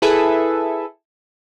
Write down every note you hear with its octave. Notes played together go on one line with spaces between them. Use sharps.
E4 G#4 A4 B4 E5